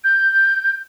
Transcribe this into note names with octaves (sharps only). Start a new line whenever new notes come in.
G6